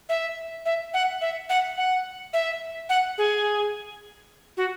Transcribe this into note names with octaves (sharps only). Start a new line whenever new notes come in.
E5
E5
F#5
E5
F#5
F#5
E5
F#5
G#4
F#4